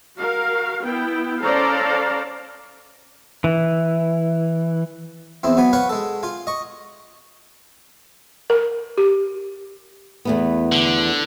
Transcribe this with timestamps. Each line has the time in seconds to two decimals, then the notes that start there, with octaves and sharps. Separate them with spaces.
0.18 F#4 A#4 F5
0.82 B3 E4 G5
1.42 C#4 A4 C5 D5 F5 A#5
3.44 E3
5.43 E2 C4 E4
5.57 F#3 B3 G#5 B5
5.73 B4 C#5 F5 F#5 C#6
5.89 G#3 A4
6.23 F4 G#5
6.47 D#5 C#6
8.50 A#4
8.98 G4
10.25 E2 A3 B3
10.72 D3